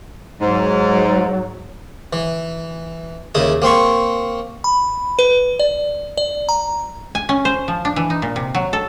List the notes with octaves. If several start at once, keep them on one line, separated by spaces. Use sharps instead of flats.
G#2 F#3
E3
D#2 C#3 E4 D#6
A#3 C4 C6 C#6
B5
B4
D5
D5
A#5
G#5
C#4
C5
F3
D4
E3
D#4
A#2
C3
F#3
A4